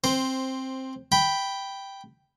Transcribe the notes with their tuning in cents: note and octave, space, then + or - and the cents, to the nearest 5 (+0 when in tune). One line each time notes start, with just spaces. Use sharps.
C4 +10 C5 +0
G5 +0 B5 +0